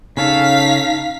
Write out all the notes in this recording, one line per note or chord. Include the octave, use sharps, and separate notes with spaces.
C#3 C#4 D#4 A4 F5 B6